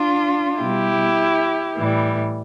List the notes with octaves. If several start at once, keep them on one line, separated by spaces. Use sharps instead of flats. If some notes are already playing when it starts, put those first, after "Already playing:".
Already playing: D4 F4
B2 G3 E4 G4
A2 E3 G3